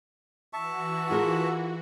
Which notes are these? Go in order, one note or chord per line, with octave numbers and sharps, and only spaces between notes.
E3 F#4 E5 A5 C#6
F4 G#4 A#4